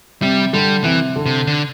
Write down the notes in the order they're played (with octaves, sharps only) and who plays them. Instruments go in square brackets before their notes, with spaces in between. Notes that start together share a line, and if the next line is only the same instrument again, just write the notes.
[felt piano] C3 [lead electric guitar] G3
[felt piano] D3 [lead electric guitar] G3
[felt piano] C3 [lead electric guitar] E3
[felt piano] D3
[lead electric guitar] C3
D3